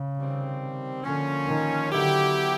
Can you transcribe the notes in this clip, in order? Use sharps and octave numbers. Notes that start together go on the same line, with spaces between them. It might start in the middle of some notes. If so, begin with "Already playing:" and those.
Already playing: C#3
C3 D#3 G3 C4
D3 F3 A#3 C#4
D#3
D3 F#3 B3 E4 G4